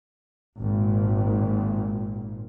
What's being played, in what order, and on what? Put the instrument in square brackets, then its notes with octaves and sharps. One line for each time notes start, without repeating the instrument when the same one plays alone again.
[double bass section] G#1 A#2